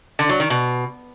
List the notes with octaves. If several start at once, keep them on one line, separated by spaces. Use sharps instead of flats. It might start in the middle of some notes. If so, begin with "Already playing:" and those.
D3
F#3
D#3
B2